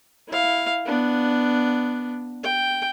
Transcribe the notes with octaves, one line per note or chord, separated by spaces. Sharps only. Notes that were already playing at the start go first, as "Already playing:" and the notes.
E4 F5
B3 D4
G5